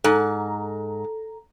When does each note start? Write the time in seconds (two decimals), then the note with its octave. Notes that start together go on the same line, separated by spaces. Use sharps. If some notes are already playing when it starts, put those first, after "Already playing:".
0.04 G#2 A4 A#5